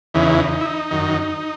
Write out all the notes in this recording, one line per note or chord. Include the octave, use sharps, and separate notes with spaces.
E2 C#3 E3 D#4
D#4
E4
D#4
F#2 D#3